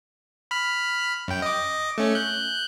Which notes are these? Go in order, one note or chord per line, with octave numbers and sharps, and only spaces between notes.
B5 F6
F#2 G5
D#5 D6
A3 C#4
F#6 G6